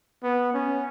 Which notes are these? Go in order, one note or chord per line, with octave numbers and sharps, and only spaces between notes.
B3
C#4